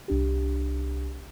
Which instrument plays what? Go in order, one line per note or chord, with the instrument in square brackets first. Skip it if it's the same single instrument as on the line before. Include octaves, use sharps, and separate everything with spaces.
[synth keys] C2 D4 G4